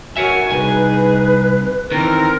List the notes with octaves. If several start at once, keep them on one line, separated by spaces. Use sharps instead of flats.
F#4 A#4 C#5 E5 G#5
C2 D#4 G#4 B4 G#5
D#3 E3 C4 A#4